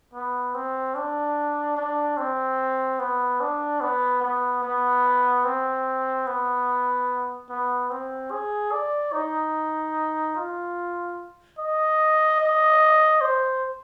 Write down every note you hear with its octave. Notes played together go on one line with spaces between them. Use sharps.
B3
C4
D4
D4
C4
B3
D4
B3
B3
B3
C4
B3
B3
C4
G#4
D5
D#4
F4
D#5
D#5
C5